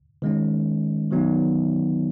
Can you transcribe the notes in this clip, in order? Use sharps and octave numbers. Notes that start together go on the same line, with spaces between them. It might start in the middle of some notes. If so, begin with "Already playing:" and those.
D#3 G#3 C#4
D#3 F#3 B3 D#4